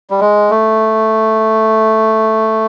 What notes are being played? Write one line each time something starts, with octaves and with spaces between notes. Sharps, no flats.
G3
G#3
A3